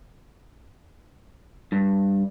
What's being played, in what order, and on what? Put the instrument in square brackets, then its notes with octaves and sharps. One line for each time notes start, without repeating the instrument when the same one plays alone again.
[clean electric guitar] G2